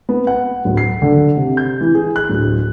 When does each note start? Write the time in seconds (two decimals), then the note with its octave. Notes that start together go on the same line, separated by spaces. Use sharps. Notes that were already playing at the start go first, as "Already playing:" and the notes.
0.09 B3
0.27 F#5
0.65 D1
0.77 C7
1.02 D3
1.37 C3
1.57 G6
1.81 E3
1.95 G#4
2.16 F#6
2.29 D1